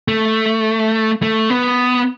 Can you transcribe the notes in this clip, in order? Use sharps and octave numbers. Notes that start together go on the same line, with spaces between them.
A3
A3
B3